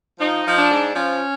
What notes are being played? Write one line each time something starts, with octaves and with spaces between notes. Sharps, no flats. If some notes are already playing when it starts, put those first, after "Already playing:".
F3 D#4
F3
D4
G#2
F3 C#4